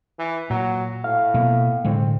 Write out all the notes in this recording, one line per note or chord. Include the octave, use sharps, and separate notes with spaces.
E3
A#2 F#3
A2 F5
B2 A#3
A2 D3 G#3 C4